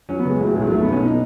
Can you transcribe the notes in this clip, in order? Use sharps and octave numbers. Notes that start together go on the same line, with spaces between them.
F#3 C#4
B3
C#2
G#3
A2 F#3
B1 G#3
F#3
B1 A3
B3
B1
C#4
B2 D#4